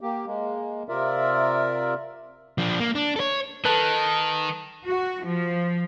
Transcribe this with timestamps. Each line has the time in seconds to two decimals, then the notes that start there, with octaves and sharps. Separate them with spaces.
0.01 A#3 G4
0.26 G#3 A#3
0.89 C3 F4 A#4 D5 E5
2.58 F3 D4
2.80 A#3
2.95 D4
3.16 A4 C#5
3.65 D#3 A4 B4 A5 F#6
4.87 F#4
5.24 F3